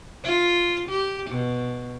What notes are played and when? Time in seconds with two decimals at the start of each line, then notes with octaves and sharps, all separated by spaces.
0.24 F4
0.89 G4
1.30 B2